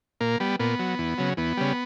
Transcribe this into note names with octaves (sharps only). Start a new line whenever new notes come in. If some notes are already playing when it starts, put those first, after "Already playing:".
A#2 A#3
G3 B3
A#2 B3
F#3
E2
C#3 F#3
E2 B3
C#3 G3